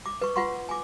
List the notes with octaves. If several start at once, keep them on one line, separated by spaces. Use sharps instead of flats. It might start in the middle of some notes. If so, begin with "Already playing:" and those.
D6
B4 C#6
F4 B4 F#5 C6 C#6
G#5 D6